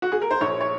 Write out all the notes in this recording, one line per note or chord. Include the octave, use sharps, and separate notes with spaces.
F#4
G#4
A#4
C5
A#1 C#5
C#5